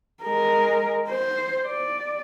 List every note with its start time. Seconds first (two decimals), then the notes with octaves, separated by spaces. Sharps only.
0.23 G#3 A#4
1.09 C5
1.66 D5